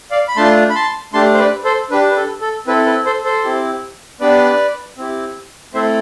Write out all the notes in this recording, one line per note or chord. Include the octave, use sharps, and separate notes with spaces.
D5 F5
B5
A3 D4 F4 A5 C6
B5
A5 C6
A3 D4 G4 A5 C6
C5
B4 D5
A4 C5
D4 G4 B4
B4
A4
A4
C4 E4 A4 B4
B4
A4 C5
A4 C5
C4 E4 G4
B3 D4 G4 B4 D5
C4 E4 G4
A3 C4 E4 A4 C5 E5